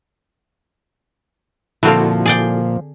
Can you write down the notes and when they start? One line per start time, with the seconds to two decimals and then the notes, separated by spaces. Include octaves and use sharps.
1.83 A#2 D3 F3 C4 E4 F#4 A4 F5
2.25 G#4 D5 G5